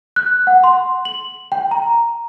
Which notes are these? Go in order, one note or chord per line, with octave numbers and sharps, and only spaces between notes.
F#6
F#5
C6
F#7
G5
A#5